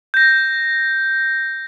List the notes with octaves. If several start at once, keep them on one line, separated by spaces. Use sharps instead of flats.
G6 A#6